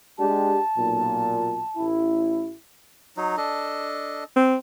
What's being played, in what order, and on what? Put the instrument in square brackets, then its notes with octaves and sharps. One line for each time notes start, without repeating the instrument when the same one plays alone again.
[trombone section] G#3 D4 G4 [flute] A5
[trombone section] B1 A#2
A1 E4
[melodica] F#3 D#4
D4 A4 D#5
[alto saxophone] C4